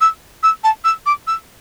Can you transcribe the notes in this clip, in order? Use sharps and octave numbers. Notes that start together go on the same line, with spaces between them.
E6
E6
A5
E6
D6
E6